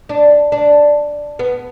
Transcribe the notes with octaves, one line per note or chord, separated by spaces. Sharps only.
D4
D4
B3